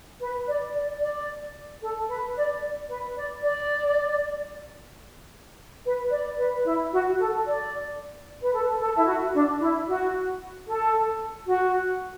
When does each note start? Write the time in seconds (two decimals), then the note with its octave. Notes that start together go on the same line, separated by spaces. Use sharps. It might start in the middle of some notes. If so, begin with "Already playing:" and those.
0.21 B4
0.48 D5
0.75 D5
1.01 D5
1.82 A4
2.09 B4
2.36 D5
2.90 B4
3.16 D5
3.43 D5
5.84 B4
6.11 D5
6.38 B4
6.65 E4
6.92 F#4
7.19 A4
7.46 D5
8.42 B4
8.53 A4
8.80 A4
8.97 E4
9.07 F#4
9.34 D4
9.60 E4
9.87 F#4
10.68 A4
11.48 F#4